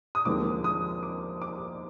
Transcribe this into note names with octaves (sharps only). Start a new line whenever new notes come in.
D#6
D#2 D3 F3 G#3 C4 D6
D#6
D6
D6